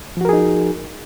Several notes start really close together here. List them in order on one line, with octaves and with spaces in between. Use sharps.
F3 F#4 A#4 G#4 D#4